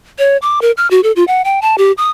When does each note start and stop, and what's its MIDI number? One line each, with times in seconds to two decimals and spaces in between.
0.19 0.37 73
0.42 0.62 86
0.62 0.72 70
0.77 0.89 89
0.91 1.01 66
1.03 1.12 69
1.16 1.24 65
1.28 1.42 78
1.45 1.60 79
1.62 1.76 81
1.78 1.92 67
1.98 2.10 87